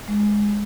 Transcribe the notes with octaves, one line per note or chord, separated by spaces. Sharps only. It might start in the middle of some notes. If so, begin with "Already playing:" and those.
G#3